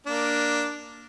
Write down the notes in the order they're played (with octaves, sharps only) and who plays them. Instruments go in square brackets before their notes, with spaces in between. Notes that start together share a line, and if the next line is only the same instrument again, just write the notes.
[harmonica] A#3 D4